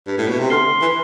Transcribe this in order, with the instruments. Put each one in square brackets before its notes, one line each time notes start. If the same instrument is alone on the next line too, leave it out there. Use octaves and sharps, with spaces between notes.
[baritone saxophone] G2
A2
B2
C3
[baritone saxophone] D3 [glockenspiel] C6 F6 C7 G7
[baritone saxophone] E3